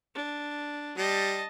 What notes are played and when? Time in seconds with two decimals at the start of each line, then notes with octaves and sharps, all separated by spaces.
0.15 D4
0.98 G3 D#5 A5